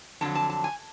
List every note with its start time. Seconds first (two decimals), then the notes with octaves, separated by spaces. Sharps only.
0.21 F2 D3 F#3 A5
0.35 A5
0.50 A5
0.64 G#5